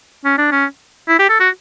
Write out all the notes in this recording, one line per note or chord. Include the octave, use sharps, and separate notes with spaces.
C#4
D4
C#4
E4
G4
A4
F#4